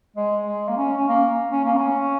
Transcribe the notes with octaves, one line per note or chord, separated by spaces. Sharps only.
G#3
G#3
A#3
C#4
C#4
A#3
C#4
A#3
C#4